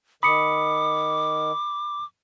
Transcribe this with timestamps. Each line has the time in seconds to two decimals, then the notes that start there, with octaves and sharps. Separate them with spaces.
0.23 D#3 B5 D6 D#6 C#7